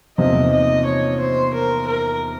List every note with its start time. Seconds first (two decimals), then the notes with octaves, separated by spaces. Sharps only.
0.18 E2 C3 F3 A#3 D#4 D#5
0.51 D#5
0.85 C#5
1.19 C5
1.54 A#4
1.87 A#4